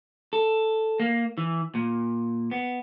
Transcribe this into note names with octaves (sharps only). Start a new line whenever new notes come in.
A4
A#3
E3
A#2
B3